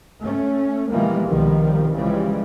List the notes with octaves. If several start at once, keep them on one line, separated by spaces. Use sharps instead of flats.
A3 C#4
B2 E3 F3 G3 G#3 A#3
C2 B2 D#3 F3 G3
C#3 E3 F3 G3 G#3